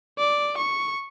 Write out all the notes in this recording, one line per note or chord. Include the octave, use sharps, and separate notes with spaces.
D5
C#6